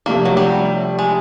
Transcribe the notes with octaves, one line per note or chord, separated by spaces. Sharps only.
C3 F3 A3 A#3 D4 G4
F#3
G3
G#3